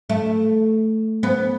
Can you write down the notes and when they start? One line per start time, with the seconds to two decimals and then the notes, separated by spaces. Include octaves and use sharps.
0.10 A3
1.23 B3